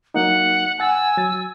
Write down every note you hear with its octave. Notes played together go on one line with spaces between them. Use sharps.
F#3 A#3 D#4 F#5
F#5 G#5 E6 A6
F#3 A6